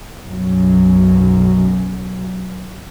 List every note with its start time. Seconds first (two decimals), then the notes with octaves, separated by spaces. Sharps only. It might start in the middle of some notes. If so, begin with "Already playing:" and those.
0.24 B1 F#2 B2 F#3